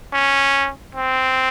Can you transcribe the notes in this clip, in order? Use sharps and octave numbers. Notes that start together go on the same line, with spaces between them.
C#4
C4